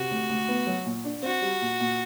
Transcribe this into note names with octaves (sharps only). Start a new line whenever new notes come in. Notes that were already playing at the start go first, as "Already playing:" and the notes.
Already playing: C3 F#4
D2
D2
B3
F#3
A#2
D4
C4 F#4
G3
A#2
A#2